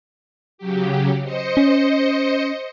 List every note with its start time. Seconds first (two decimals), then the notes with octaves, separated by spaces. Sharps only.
0.58 C#3 F#3 G4
1.23 C5 D#5 C#7
1.57 C#4